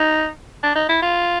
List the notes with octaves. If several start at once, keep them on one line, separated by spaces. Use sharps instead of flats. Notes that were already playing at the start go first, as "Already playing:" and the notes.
Already playing: D#4
D4
D#4
E4
F4